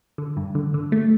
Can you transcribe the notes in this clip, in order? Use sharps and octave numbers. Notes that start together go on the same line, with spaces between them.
D3
G2
D3
D3
A3